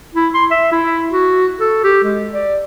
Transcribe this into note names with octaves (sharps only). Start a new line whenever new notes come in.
E4
C6
E5
E4
F#4
A4
G4
G#3
D5